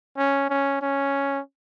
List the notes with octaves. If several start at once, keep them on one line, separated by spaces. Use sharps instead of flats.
C#4
C#4
C#4